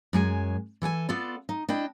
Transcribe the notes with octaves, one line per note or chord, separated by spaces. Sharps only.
F#2 G#3 G4 G#5
E3 A4 G5 G#5
B3 F4 A4 D5
D#4
D4 E4 D#5 G5